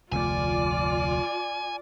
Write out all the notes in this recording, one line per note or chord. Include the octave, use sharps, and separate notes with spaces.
F1 D2 A3 F4 D5 G#5